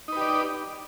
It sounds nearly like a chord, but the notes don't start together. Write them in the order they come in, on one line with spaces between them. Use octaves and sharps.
D#4 B4 G4 D5